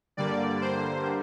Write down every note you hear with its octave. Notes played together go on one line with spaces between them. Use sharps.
G2 D3 G3 A#3 D5
C5